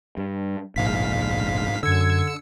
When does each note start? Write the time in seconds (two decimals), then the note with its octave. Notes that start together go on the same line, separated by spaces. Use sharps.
0.17 G2
0.76 F1 A#1 G#2 F5 B6
1.83 F#2 D3 E6 G#6 C#7